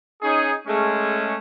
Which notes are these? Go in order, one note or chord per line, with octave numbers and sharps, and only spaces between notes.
C#4 D#4 G#4
G#3 A3 C#4